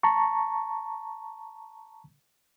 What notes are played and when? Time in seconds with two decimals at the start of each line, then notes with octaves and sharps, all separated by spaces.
0.03 A5 A#5 C#6